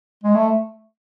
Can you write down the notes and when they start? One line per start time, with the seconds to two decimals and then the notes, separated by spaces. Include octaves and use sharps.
0.24 G#3
0.35 A3